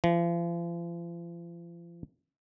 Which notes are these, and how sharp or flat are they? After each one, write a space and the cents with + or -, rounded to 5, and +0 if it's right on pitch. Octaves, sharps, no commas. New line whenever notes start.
F3 -40